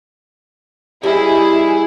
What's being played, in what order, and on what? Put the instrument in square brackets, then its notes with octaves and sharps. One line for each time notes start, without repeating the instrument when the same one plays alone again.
[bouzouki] G3 D#5 [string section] E4 G#4